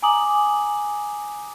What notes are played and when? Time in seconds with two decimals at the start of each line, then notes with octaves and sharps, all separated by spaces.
0.02 G#5 A#5 D6 D#6 F#7